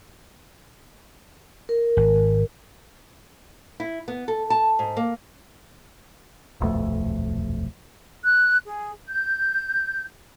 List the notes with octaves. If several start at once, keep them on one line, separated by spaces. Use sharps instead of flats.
A#4
G#1
E4
B3
A4
A5
G#2
A#3
D#1 B1 F2 A3
F#6
G#4
G6